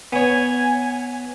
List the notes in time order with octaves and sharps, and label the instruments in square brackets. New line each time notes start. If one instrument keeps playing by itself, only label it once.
[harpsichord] B3 C#5 [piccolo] G#5